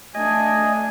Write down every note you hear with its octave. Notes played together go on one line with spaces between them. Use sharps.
A3 D4 D#5 G#5